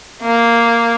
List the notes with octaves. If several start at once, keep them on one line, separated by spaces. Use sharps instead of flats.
A#3